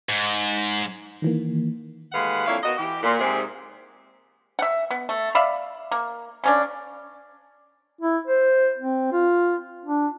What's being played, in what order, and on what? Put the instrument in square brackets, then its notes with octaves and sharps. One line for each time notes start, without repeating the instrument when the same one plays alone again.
[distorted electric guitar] G#2
[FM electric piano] D#3 E3 A#3
[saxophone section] D#2 G#3 A3 B4 F5 F#5
F2 A#3 D4 E4 C#5 F5
B2 F#4 A#4 D#5
E3 G4
A#2
G#2 C3 G#4
[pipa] E5 F#5
B3
A3
D5 E5 F5 B5
A#3
C#3 C#4 D4
[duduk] E4
C5
C4
F4
D4